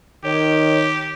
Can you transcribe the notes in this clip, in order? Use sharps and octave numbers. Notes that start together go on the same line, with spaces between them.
D#3 G4 C#5